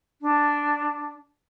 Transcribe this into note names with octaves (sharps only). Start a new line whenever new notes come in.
D4